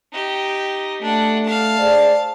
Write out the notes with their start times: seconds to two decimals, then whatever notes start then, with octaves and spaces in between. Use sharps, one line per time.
0.13 D#4 G4
1.02 A3 D4 F#5
1.45 F5 A5
1.79 G#4 C5 D5